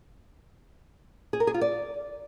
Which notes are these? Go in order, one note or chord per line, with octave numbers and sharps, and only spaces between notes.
G#4
A#4
G#4
F4
D5